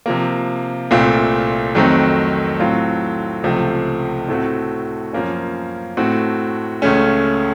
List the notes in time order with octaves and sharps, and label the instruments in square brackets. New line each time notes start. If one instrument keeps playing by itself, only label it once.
[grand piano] C3 F3 A#3
C2 A#2 A3 C4 F4
F2 D#3 F#3 A3 C4
A2 F#3 C4 F4
C#2 C3 F3 A3
A2 A3 C4 F#4
F#2 F3 A#3 C#4
A2 A3 C4 F#4
C#2 C#3 A3 C#4